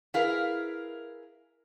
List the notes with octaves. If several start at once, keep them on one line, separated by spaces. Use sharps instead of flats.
E4 G#4 A#4 B4 F5